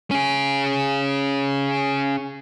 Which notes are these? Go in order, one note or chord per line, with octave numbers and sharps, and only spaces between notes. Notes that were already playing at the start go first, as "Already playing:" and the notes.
C#4 G#4